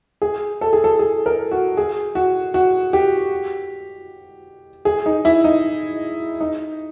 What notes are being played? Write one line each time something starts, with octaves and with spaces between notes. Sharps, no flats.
G#4
A4
G#4
A4
G#4
A#4
F#4
G#4
F#4
F#4
G4
G#4
D#4
E4
D#4
D#4